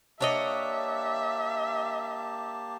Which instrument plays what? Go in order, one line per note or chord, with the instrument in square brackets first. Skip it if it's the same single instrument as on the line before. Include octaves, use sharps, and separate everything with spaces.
[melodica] A#3 G4 A5 [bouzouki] D4 C#5 D#5 [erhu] E5